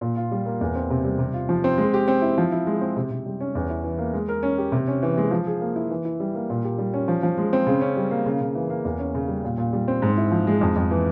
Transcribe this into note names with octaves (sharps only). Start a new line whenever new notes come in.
A#2
F4
G3
A#3
E2
C4
C3
G3
C3
F4
F3
C4
G#3
G4
C4
E4
F3
E4
G#3
C4
C3
C3
G3
C#4
E2
E4
E3
A#3
G#3
A#4
C#4
G4
C3
C#4
E3
G#3
F3
G#4
A#3
E4
E3
E4
G3
A#3
A#2
G4
G3
C#4
F3
F3
G#3
C4
C#3
C#4
G3
A#3
C#3
C#3
E3
A#3
E2
C#4
C#3
G3
A#2
A#2
G3
C4
G#2
E4
F3
G#3
F2
F2
E3